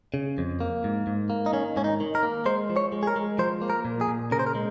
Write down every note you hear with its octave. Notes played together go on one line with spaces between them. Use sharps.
C#3
F2
A#3
G#2
G#2
A#3
D#4
D#3 C#4
G#2 C#4
D#4
D#3
A#4
A#3
G#3 C5
F3
C#5
G#3
G#4
A#4
G#3
F3 C5
A#3
A#4
A#2
G#4
A#2
C#3 A#4
C5
A#4
G#3